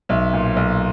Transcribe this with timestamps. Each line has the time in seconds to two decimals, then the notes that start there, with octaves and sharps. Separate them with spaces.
0.09 B1 E5
0.33 A#2
0.56 B1